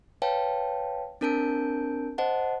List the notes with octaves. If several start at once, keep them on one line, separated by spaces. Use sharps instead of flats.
B4 C#5 F5 G5 A5
C4 D4 A#4 A5 G6 D7
C5 D#5 F#5 A5